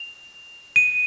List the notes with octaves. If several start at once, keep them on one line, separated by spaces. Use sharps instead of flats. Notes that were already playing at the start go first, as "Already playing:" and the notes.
Already playing: F7
D#7